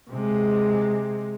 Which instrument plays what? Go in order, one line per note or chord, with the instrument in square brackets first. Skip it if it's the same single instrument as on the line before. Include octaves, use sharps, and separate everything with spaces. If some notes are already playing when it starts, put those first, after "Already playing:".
[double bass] C3 G#3